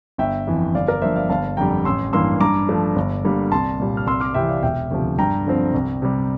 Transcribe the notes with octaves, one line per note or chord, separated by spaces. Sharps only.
G1 E5 G5
F2 E3
G1 D5 F5
A#4 D5
G2 F3 A#3 C5 E5
D5 F5
G1 F5 A5
F2 D3 G3 G5 A#5
A1 C6 E6
G2 E3 A#3 C6 E6
G2 A#5 D6
F3 A3 D4
G1
G2 D3 G3 A#3
C2 A5 C6
A#2 G3
F6
C2 C6 E6
D6 F6
C3 E3 E5 G5
D5 F5
E1 E5 G5
D2 C3 F3
G2 G5 A#5
D3 F3 C4
C2
C3 G3